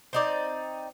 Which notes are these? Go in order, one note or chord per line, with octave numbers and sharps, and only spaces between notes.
C4 D#4 D5